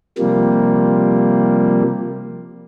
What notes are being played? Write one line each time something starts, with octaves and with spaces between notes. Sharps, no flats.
C3 F3 G3 A#3